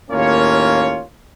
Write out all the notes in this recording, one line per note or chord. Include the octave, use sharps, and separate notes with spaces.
D#2 A2 A#3 C#4 F4 C#5